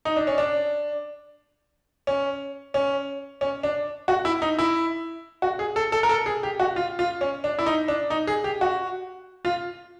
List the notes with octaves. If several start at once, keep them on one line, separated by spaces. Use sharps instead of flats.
D#4
D4
C#4
D4
C#4
C#4
C#4
D4
F#4
E4
D#4
E4
F#4
G#4
A4
A4
A#4
A4
G#4
G4
F#4
F4
F4
C#4
D4
E4
D#4
D4
D#4
G#4
G4
F#4
F4